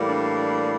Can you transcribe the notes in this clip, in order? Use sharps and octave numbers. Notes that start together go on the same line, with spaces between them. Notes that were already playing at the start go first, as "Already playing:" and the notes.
Already playing: A2 E3 G3 A#3
D4